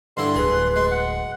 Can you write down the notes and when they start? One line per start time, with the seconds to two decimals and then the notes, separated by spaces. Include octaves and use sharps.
0.17 G2 D3 E4 C6
0.36 D1 G#4 B4
0.76 G#3 C6
0.91 F#5